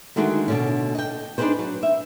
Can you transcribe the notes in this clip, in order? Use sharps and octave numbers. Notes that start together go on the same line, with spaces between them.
D3 D#3 G#3 A3 F#4 G#4
B2 D3 C#4
D#5 G5
D4 D#4 F4 G#4 B4 C5
F#3
E5